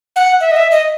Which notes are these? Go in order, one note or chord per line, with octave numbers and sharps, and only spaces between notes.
F#5
E5
D#5
E5
D#5